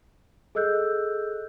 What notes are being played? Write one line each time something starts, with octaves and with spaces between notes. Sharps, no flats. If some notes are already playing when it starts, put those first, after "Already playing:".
G#4 A4 D#5 E6 F#6 G6